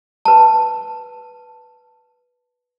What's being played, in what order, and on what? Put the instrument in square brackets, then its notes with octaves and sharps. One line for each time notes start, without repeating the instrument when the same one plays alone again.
[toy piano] B4 A5